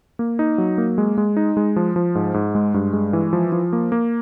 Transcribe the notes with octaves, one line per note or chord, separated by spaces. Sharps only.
A#3
D#4
F#3
A#3
G#3
G#3
D#4
G#3
F3
F3
G#2
G#2
G#3
G2
G#3
E3
F3
F3
A#3
A#3